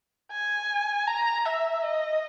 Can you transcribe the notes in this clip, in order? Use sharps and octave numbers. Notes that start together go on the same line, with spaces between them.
G#5
A#5
E5
D#5